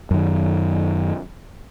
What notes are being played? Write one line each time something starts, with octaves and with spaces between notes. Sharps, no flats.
F#2 D#3